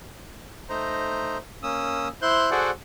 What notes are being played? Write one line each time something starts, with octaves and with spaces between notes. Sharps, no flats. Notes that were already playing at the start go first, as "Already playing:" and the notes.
A3 D#4 C5 A#5
A#3 C#4 D#6 E6
E4 C5 C6 F#6 G6
F#4 G#4 A4 C5 D5 F#5